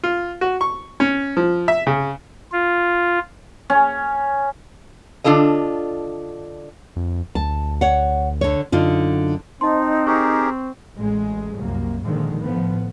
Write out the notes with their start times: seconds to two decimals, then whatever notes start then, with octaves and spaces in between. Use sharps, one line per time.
0.03 F4
0.41 F#4
0.61 C#6
1.00 C#4
1.37 F3
1.68 E5
1.87 C#3
2.52 F4
3.70 C#4
5.24 D3 D4 F4 A4 D#5
6.96 F2
7.35 D2 A5
7.81 C#5 F#5
8.41 D3 C#5
8.72 F#2 D3 D#4 F4
9.61 C4 D#4 D#5 A5 C6
10.07 G4 G#4 A#4 C#6
10.97 A1 G#3
11.56 C2 F#2 A#3
12.03 A#2 D3 D#3 F3 G#3
12.40 A2 F3 B3